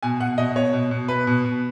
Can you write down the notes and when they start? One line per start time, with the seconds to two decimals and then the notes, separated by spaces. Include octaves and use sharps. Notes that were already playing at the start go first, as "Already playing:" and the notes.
0.03 B2 G#5
0.20 B2 F#5
0.38 B2 D#5
0.55 B2 C#5
0.73 B2
0.91 B2
1.08 B2 B4
1.27 B2
1.45 B2